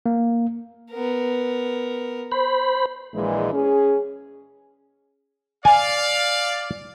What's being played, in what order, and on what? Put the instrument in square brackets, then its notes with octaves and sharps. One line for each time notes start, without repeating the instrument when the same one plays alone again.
[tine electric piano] A#3
[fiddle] B3 A#4
[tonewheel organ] C5 B5
[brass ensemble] A#1 A#2 E3 G#3
C#4 G#4
[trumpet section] D5 F5 [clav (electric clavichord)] G#5